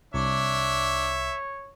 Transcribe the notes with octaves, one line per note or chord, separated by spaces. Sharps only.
C2 D4 C#5 E5